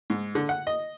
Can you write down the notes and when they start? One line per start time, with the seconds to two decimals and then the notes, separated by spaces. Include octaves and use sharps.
0.10 G#2
0.35 D3
0.49 F#5
0.67 D#5